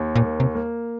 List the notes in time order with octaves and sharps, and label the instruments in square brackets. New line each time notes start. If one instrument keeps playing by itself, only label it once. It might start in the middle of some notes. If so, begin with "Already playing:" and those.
Already playing: [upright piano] D#2
[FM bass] A#2
[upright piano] A#3
[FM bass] C3
[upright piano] A#3